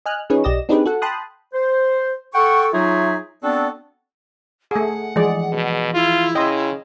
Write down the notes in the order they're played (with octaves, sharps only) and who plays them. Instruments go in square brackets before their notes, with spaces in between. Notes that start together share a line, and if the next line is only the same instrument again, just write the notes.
[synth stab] D#5 G#5 F6 F#6
F3 C#4 D#4 G#4 B4 C#5
B1 G4 D5 D#5 A#6 E7
C4 D4 D#4 G4 G#4 B4
F#4 A4 F#5
G5 A5 B5 C6 D#6 F#6
[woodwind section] C5
A4 F#5 G5 C#6
F#3 D#4 F4 G#4 C#5 E5
B3 C4 D4 F#4 A4 D5
[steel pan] A3 G#4 [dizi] F#5
[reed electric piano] E3 F3 G#4 [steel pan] G#3 D5
[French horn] B2
[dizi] E4 [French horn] F4
[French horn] C#3 [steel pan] D#5 [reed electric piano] G5 C6